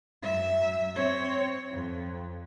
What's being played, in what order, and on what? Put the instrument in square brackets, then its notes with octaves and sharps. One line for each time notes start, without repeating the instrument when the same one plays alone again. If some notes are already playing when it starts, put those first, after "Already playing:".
[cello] F#2 E5
C4 C#5
F2